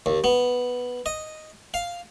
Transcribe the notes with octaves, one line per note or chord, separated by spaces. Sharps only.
D#2
B3
D#5
F5